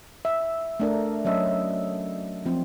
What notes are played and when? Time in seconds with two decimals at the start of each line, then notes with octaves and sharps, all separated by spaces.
0.25 E5
0.80 A3 D4 A#4
1.25 F#3 C#4 D#5 E5
2.45 F3 C4